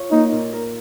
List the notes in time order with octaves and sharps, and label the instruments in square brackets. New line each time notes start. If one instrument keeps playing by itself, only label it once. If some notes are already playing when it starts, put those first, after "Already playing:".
Already playing: [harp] F4 C#5
[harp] A#3 [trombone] D#4
[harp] A#2
A#4